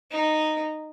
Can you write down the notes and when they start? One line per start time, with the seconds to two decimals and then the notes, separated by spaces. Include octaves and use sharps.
0.11 D#4